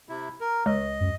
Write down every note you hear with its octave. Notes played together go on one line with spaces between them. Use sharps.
C3 E4
A#4
C#2 D#5
F#2